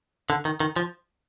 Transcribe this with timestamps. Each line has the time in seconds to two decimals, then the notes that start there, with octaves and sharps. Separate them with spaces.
0.30 D3
0.45 D#3
0.60 D#3
0.76 F3